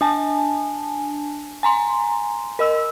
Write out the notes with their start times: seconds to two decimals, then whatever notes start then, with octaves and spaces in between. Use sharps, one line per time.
0.01 D4 G#5 A5
1.63 G#5 A#5 C6
2.59 A#4 D#5 E6